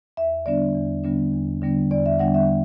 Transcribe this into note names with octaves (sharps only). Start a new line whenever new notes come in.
E2 E5
D3 G3 B3 D4 D5
E2
D3 G3 B3 D4
E2
D3 G3 B3 D4
E2 D5
E5
D3 G3 B3 D4 F#5
E5